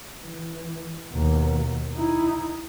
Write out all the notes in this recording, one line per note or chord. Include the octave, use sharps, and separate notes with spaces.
E3
D#2 B2
D#4 E4